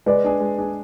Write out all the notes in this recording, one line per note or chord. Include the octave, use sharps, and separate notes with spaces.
G#3 B4 D5
D4 G#4
G#3
D4 G#4